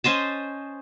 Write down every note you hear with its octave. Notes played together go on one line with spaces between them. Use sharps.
C#4 C5 D#5 A5